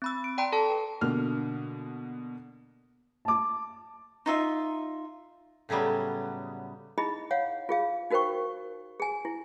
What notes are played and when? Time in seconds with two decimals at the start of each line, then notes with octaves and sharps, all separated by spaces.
0.02 C4 B5 E6
0.24 D7
0.38 D5 G5 A#5 C6 D7
0.52 A4 A5 D#6
0.70 B4
1.01 B2 D3 A#3 F6
3.25 A5 D6
4.26 D#4 F4 E5
5.69 A2 C#3 F#3 G3 B3
6.98 D#4 E4 G#4 D#5 B5
7.31 C#5 F5 F#5
7.69 F4 G#4 F5
8.10 D#4 F#4 A#4 C5 G5 C#6
9.00 G#4 G#5
9.25 E4